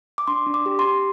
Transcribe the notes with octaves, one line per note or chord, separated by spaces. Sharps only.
D6
D4 C6
D4
D6
G4
C6
G4